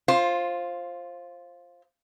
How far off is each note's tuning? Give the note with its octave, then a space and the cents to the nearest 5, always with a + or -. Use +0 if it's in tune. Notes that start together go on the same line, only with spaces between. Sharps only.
F4 +0 C5 +20